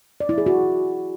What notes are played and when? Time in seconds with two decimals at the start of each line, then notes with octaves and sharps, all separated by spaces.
0.20 D5
0.29 E4
0.38 G#4
0.46 F#4